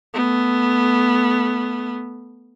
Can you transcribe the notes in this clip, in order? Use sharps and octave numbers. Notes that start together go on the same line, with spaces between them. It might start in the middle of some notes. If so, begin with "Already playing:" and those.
A3 B3